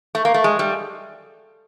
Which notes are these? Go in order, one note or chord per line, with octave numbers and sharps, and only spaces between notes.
A3
A#3
A3
G#3
G3